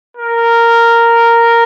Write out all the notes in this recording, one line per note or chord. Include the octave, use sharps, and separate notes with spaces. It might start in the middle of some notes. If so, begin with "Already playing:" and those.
A#4